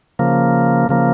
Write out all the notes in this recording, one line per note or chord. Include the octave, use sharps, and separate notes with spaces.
C#3 F3 A#3
C#3 F3 A#3